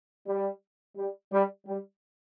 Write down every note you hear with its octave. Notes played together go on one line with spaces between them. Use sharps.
G3
G3
G3
G3